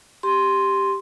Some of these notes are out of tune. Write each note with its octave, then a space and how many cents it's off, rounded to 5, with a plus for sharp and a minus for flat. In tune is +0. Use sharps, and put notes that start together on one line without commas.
G4 +0 C6 +0